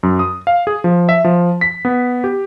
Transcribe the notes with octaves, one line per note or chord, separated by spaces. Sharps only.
F#2
D#6
F5
G#4
F3
E5
F3
B6
B3
G4